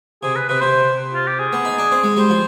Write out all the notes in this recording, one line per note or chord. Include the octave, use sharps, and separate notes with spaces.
C3 G#4
B4
C3 B4
C3 C5
F4
G4
G#4
B3
D#4
D4
C4
G#3
G3 C5
F3